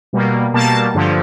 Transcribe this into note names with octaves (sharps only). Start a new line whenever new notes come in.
B2 G3 A#3
B2 G3 A#3 A5
G2 D3 F3